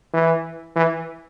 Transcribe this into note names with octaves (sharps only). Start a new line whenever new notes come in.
E3
E3